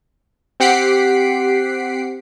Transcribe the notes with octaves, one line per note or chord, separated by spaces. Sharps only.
C4 G4 F#5 B6 C7 D7